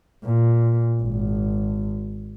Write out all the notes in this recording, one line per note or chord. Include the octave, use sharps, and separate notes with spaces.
A#2
G#1